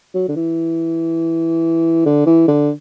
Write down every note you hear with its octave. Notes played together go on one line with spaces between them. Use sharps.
F#3
D3
E3
D3
E3
D3